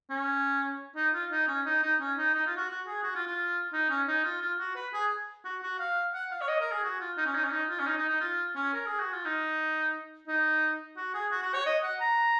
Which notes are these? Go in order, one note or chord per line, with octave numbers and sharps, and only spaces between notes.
C#4
D#4
F4
D#4
C#4
D#4
D#4
C#4
D#4
D#4
F4
F#4
F#4
G#4
F#4
F4
F4
D#4
C#4
D#4
F4
F4
F#4
B4
G#4
F#4
F#4
F5
F#5
F5
C#5
D#5
A#4
G#4
F#4
F4
D#4
C#4
D#4
C#4
D#4
F4
C#4
D#4
D#4
D#4
F4
C#4
A#4
G#4
F#4
F4
D#4
D#4
F#4
G#4
F#4
F#4
C#5
D#5
F#5
A#5